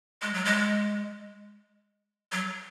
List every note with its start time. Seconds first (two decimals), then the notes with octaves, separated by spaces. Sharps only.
0.22 G#3
0.34 F#3
0.45 G#3
2.32 F#3